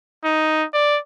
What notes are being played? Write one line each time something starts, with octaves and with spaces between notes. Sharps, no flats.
D#4
D5